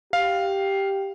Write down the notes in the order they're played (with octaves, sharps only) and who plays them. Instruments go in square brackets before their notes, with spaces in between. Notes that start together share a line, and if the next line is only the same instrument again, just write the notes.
[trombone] G4 [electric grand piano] F5